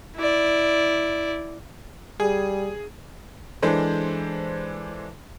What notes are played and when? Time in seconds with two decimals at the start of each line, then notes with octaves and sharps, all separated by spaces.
0.16 E4 D5
2.20 G3 G#4
3.62 E3 G#3 D4 A4 C5